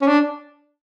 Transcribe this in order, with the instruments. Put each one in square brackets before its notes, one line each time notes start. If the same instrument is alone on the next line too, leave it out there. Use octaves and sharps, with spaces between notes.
[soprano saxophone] C#4
D4